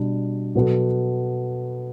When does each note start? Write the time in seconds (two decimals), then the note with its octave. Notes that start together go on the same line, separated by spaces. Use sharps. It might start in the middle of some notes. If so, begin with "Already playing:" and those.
Already playing: B2 G3 D4
0.55 B2 F#3 B3 F#4 A4